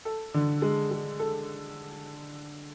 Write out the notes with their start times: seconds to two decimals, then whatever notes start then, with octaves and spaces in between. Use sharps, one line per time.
0.05 A4
0.34 D3
0.62 G#3
0.91 G#3
1.20 A4